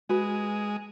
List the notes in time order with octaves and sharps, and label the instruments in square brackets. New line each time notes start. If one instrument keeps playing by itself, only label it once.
[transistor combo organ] G#3 [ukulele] F#4 B4